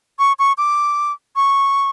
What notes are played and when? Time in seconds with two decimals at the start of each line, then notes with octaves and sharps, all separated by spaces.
0.19 C#6
0.39 C#6
0.58 D6
1.36 C#6